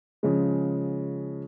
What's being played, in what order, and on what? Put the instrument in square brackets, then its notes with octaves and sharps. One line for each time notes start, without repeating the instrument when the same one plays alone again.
[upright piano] C#3 F3 G#3